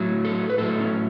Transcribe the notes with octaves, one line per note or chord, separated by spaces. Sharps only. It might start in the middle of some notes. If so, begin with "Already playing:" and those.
Already playing: A2 F#3
A4
B4
A2 F#3 A4
C#4